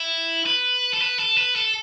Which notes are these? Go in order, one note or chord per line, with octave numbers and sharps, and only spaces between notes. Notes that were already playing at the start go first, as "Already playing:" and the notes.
Already playing: E4
B4
A4
B4
A4
B4
A4